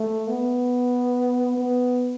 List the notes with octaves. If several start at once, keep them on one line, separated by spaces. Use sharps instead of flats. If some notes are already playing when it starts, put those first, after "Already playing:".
Already playing: A3
B3
B3